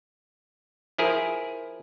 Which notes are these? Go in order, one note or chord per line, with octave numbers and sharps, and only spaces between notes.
F3 E4 G#4 A#4